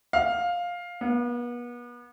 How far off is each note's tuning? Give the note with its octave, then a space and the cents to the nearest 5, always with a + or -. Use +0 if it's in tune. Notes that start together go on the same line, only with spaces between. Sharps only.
F5 +10
B3 -35